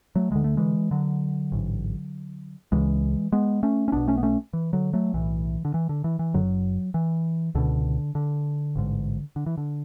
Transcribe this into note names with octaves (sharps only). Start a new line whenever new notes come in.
F#3 A3
D2 D3 G#3
A3
E3 G#3
D3 F#3
A1 G#2
C#2 C#3 E3 G#3
G#3 B3
A3 C#4
C#4
B1 B2 B3 D4
A3 C#4
B3
A3 C#4
E3
D3 F#3
F#3 A3
B1 A2 E3
D3
E3
D3
E3
E3
F#1 F#2 D3 F#3
E3
C#2 B2 D3
D3
A1 G#2
D3
E3
D3